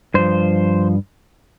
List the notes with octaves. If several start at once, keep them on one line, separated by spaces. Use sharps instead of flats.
G2 F3 C5